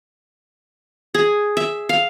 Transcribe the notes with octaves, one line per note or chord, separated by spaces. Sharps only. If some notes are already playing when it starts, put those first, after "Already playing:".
G#4
E5
F5